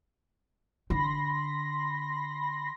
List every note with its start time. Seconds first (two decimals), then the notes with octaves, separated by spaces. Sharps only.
0.90 D3 B5 C6 A#6